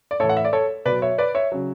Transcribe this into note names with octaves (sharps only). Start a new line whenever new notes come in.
D5
A2 E3 A4 C#5
F#5
E5
D5
A4 C#5
B2 F#3 B4 D5
C#5 E5
B4 D5
C#5 E5
C#3 F#3